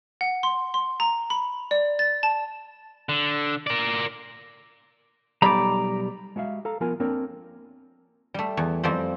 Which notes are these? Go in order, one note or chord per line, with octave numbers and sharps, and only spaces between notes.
F#5
C6
C6
A#5
B5
D5
A6
A5
D3
A#4 D5
B1 G3 A#5 B5 D6
G#3 F#4 E5 F5
A4 F5 A#5
F3 B3 F4 A#4 G#5
A#3 C4 D4 A#4 C#5
G3 A3
E2
F2 F3 G3 C4